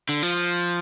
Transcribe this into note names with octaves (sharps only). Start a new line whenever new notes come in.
D3
F3